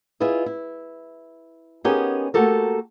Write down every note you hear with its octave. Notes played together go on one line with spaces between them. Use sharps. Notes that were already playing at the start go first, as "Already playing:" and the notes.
E4 F4 G#4 B4 D#5
E4
B3 C#4 D#4 G4 G#4 A#4
A3 A#3 F#4 G4 A4 A#4